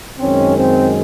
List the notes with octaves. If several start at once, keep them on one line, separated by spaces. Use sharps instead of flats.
F#2 D#3 G#3 C4 C#4
C4